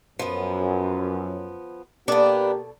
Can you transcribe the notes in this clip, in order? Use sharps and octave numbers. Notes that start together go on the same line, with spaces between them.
F#2 F3 B3
B2 A#3 B3 D4 G4 A4 D5